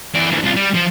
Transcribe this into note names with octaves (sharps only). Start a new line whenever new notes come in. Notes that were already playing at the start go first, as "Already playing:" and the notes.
E3 D5
D2 E3
C2 F4
G3
F3